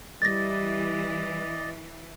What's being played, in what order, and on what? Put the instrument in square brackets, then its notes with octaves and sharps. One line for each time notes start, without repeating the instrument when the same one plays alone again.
[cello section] E3 [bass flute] G3 [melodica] D5 D#5 [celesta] A6 A#6